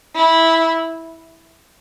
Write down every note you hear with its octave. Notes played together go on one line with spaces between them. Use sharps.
E4